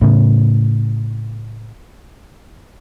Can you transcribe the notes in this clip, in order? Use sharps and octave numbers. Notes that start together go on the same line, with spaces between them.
A2 C#3